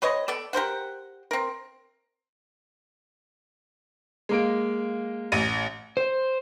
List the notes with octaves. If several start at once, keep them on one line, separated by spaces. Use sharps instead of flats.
C3 B4 C#5 D#5
B3 A4 D5
G4 A#4 C5 F#5
C4 A#4
G#3 A#3 D7
A1 D#7
C5